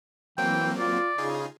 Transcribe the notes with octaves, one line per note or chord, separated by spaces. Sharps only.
E3 F#3 A#3 C4 G5
F4 D5
C#3 D#4 F4 G#4